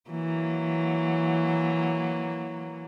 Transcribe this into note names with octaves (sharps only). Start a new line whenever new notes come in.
E3 F#3 A#3